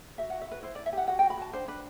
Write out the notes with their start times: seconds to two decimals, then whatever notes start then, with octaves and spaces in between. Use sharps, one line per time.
0.18 F#4 E5
0.30 F#4 F#5
0.41 E5
0.48 F#4 B4
0.63 E4 C5
0.75 E4 D5
0.86 E5
0.93 G4 F#5
1.08 F#4 F#5
1.19 F#4 G5
1.30 B5
1.37 F#4 A5
1.53 D4 C5
1.68 D4 B4